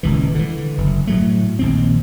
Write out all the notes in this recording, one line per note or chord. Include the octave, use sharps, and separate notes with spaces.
D#1 C#2 E3
D3 E3
F#1
A2 F#3 A3
A#1 D#2 C4